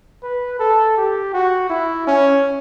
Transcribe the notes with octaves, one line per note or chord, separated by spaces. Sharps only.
B4
A4
G4
F#4
E4
C#4